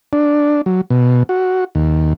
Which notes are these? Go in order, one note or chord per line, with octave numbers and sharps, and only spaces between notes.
D4
F#3
B2
F#4
D#2